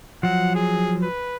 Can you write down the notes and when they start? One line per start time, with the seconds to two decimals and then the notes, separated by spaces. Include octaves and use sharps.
0.23 F3 F#3 F#5
0.55 G#4
1.03 B4